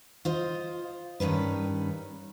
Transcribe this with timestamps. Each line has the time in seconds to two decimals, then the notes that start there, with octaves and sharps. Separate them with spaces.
0.25 F4 C5 D#5
1.20 G2 D#3 C#4 B4